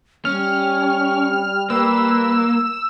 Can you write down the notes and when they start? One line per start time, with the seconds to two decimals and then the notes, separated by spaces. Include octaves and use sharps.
0.25 G3 C#4 F6
1.70 A#3 B4 E6